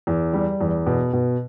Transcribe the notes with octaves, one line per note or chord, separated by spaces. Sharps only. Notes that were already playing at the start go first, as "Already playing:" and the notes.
E2
G3
E2
B2
B2